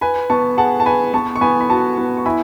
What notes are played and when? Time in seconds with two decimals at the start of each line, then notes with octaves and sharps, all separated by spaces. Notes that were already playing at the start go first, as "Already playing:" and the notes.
0.01 B4 G#5 B5
0.30 B3 A5 C#6
0.58 G#4 F#5 A5
0.80 A5
0.86 B4 G#5 B5
1.14 B3 A5 C#6
1.36 C#6
1.41 B3 G#5 B5
1.60 B5
1.69 F#4 A5 C#6
1.98 B3
2.17 C#6
2.26 E4 G#5 B5